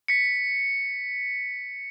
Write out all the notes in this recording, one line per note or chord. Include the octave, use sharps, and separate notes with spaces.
B6 C#7